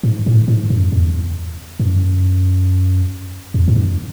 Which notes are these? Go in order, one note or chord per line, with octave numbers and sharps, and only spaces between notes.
G#2
A2
G#2
F#2
E2
F#2
E2
G#2
F#2